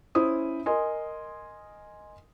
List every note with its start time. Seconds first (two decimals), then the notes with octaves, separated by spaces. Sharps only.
0.15 C#4 E4 C5 D#6
0.66 A#4 D#5 G#5 C6